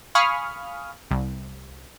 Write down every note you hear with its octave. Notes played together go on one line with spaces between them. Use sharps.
F5 G#5 B5 C#6 D#6 F6
C2